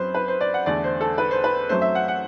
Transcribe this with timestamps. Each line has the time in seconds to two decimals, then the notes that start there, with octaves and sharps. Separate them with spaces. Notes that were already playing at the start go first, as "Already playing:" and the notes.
Already playing: F#2 F#3 C4 B4 C5
0.15 B4
0.28 C5
0.41 D5
0.54 F#5
0.66 E2 D3 A3 D5
0.84 C5
1.01 A4
1.18 B4
1.31 C5
1.44 B4
1.69 F#2 F#3 A3 C4 C5
1.82 E5
1.95 F#5
2.08 F#5